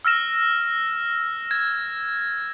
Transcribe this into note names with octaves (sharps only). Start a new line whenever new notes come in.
E6 F6 A#6 E7
G#6